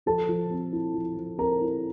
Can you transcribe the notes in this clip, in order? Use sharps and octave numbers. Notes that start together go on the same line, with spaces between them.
F3 A4 A5
F3
C4
E4
F3
F3
C4 A#4 A#5
E4